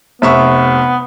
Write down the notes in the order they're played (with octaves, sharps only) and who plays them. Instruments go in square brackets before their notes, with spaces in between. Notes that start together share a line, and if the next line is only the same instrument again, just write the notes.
[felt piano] F1 E5 C#6 [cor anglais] B3